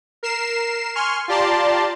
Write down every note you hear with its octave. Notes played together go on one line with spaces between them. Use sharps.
A#4 C7 E7
G#5 C6 C#6 F6
F4 G4 D5 A5 A#5 C6